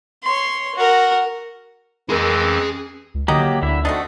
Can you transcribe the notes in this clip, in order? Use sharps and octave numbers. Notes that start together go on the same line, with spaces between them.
C#5 C6
F#4 A#4
F2 E3 G#4 A#4 C6
C#4
C#2
D3 F#3 A#3 D#4 G4 D#5 A#5
D2 D3 E4 E5
A3 C4 D4 D#4 F#4